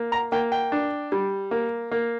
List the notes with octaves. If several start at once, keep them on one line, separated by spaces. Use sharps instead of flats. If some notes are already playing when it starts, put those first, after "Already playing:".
Already playing: A#3
A#5
A#3 G5
G5
D4
G3
A#3
A#3